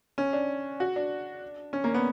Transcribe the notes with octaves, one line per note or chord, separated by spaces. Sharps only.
C#4
D4
F#4
D4
C#4
A#3
B3